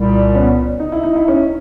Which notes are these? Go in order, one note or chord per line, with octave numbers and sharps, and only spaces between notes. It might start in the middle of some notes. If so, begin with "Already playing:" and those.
Already playing: C2 A#2 G3
B3 C#4
D#4
E4
D#4
E4
C#4 D#4